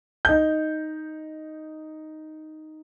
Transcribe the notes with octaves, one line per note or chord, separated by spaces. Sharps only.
D#4 G6